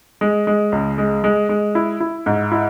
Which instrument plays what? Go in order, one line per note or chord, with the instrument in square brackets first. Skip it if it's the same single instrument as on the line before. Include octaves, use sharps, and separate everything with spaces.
[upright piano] G#3
G#3
C#2
G#3
G#3
G#3
E4
E4
G#2
E4